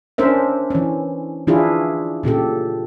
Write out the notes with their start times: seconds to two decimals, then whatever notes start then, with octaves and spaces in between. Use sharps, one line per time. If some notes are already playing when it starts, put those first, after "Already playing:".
0.18 C#4 D4 A#4 C5 E5
0.70 E3 C#4
1.47 E3 D4 E4 F4 G#4
2.23 A#2 C#3 G4 A4